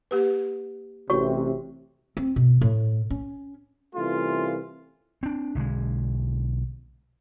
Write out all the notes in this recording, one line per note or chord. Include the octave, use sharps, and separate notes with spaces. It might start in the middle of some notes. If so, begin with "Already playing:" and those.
A#3 G4 B4
A1 C3 F#4 C#5 C#6
C4
B2
A2
C#4
C2 E3 A3 C#4 F4
C4 D4
B1 D3 G3 G#3